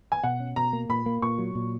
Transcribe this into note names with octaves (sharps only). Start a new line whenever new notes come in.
G#5
B2 F#5
C#4
B2 A#5
A#3
A#2 B5
A#3
A#2 C#6
F#3
A#2